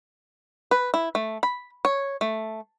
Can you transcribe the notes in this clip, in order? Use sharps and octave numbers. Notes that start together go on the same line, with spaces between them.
B4
E4
A3
B5
C#5
A3